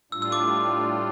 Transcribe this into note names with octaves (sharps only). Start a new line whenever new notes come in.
A2 G3 D4 F4 E6
E6
D6